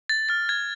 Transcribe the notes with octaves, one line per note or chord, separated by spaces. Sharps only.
A6
F6 A6
G#6